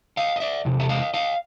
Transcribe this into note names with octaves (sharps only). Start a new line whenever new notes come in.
D#5 F5
D#5
D5 E5
E2 C3
E5
D#5 F5
D#5 F5